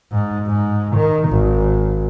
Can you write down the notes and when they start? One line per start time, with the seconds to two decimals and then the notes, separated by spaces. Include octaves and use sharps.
0.12 G#2
0.48 G#2
0.96 D#3
1.29 G#1